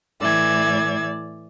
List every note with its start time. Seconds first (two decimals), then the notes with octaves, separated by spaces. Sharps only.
0.20 A2 E3 D5 E6 G#6